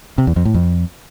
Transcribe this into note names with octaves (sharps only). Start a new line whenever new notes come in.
C3
E2
F2
A2
F2